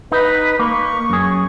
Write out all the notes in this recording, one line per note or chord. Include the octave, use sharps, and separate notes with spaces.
D#4 B4
A#3 C#6
F#2 G#4